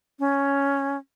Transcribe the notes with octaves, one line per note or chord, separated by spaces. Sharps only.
C#4